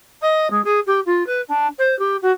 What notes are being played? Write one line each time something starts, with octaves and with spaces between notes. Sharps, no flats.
D#5
G#3
G#4
G4
F4
B4
D4
C5
G4
F#4